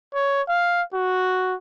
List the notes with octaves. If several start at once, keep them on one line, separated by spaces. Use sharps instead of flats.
C#5
F5
F#4